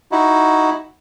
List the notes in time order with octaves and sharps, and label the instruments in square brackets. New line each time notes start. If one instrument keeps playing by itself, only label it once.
[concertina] D#4 E4 F#4